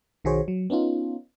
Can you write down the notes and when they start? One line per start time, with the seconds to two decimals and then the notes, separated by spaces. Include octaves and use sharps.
0.24 B1 D#3 F#4 G#4 C5 C#5
0.48 F#3
0.70 B3 C#4 D#4 F4